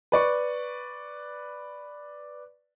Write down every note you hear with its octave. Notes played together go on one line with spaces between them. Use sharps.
B4 D5 C#6